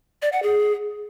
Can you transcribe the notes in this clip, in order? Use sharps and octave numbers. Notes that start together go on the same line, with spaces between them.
D5
F#5
G#4